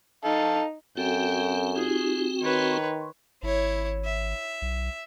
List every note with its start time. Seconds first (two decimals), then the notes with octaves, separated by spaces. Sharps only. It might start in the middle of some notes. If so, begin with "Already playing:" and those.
0.24 D#4 A4 F5
0.97 F#2 C4 F#4 A4 G5
1.76 D#4 F4 G4 G#4
2.42 D#3 B4 C#5 C6 C#6
3.43 G#1 E4 C#5
4.05 E5
4.62 B1